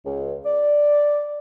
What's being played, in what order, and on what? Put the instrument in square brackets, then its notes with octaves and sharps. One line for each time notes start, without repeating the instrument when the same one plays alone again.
[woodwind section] C#2
D5